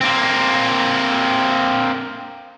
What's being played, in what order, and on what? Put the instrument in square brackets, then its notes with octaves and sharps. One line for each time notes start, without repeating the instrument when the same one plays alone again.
[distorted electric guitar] A#3 C4